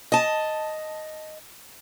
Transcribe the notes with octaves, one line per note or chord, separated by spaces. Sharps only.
D#5 A5